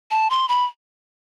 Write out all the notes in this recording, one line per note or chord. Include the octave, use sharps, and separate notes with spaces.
A5
C6
B5